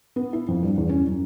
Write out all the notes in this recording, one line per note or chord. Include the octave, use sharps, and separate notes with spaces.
B3
E4
F2
G2
E2
C#4
F#2